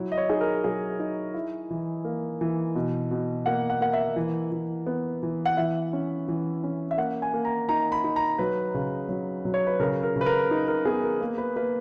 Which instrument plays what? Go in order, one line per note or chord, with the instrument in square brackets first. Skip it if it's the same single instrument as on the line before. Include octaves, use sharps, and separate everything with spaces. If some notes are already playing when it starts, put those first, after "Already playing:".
Already playing: [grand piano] F#3 E4
D#5
C#5
D#4 G#4
A#4
F#3 G#4
D#4
E4
E3
A#3
E3
B2
B2
A#3 F#5
F#5
A#3 F#5
E5
E3
E3
B3
E3
F#5
E3 E5
C#4
E3
C#4
E5
A#3 F#5
G#5
A#3
A#5
D#4 A#5
B5
D#4
A#5
F#3 B4
C#3
F#3
F#3
C#5
B4
C#3 A#4
A#4
C#3
B4
A#4
D#4
A#4
B3 G#4
A#4
A#3
B4
A#3 B4